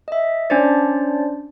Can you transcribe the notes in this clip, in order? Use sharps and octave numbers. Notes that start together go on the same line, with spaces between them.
D#5 E5
C#4 D4 C5 D5